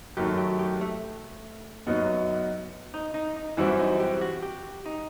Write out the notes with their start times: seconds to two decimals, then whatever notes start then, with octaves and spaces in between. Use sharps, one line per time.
0.17 F#2 D#3 F#3 A3 G4
0.38 G4
0.59 G4
0.81 A3
1.87 F#2 F#3 B3 D#4
2.94 D#4
3.14 D#4
3.36 D#4
3.57 F#2 E3 G3 C4 E4 F#4
3.79 D#4
4.00 G4
4.21 F#4
4.42 G4
4.86 D#4